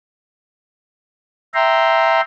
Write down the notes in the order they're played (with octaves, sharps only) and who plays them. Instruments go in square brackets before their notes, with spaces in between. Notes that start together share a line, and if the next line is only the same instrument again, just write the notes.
[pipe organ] E5 G5 A#5 C6